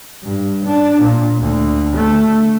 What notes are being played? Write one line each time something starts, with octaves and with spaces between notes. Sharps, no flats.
G2
D4
A#2
D2
A3